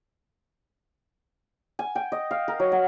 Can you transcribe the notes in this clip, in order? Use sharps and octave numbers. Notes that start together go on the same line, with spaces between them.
G#5
G5
D#5
F5
A#4
F#3
F#5